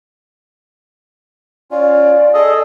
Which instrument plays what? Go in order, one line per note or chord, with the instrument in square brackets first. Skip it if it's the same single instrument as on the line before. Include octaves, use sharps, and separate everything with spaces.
[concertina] C#4 F4 [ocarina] D5
[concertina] G#4 A4 D#5